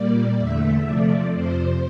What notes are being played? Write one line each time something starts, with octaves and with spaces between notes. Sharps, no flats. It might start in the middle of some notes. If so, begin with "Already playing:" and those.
Already playing: A#2 G3 A#3 D5
E2 D3 A3 E5
C3 F3 A3 D5
F2 C3 F3 C5